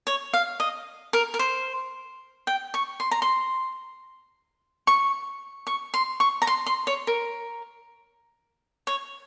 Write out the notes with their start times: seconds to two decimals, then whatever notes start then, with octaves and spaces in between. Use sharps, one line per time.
0.07 C#5
0.34 F5
0.60 D#5
1.13 A#4
1.34 A#4
1.39 C5
2.47 G5
2.74 C#6
3.00 C6
3.11 A#5
3.22 C6
4.87 C#6
5.67 C#6
5.94 C6
6.20 C#6
6.42 A#5
6.47 C6
6.66 C6
6.87 C#5
7.07 A#4
8.87 C#5